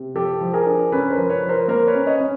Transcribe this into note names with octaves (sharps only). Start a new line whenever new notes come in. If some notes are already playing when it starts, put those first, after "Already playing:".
Already playing: C3
F3 G4 A4
F3
G#4 A#4
D4
C#4 A4 B4
A#4 C5
F3
B4 C#5
F3
A#4 C5
A#3 A#4 C5
B4 C#5
C#4
C#5 D#5
C#4